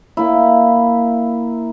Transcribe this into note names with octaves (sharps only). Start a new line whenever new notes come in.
A#3 E4